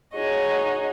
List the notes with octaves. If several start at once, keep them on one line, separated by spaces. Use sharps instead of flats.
D#4 F#4 G#4 C#5 D#5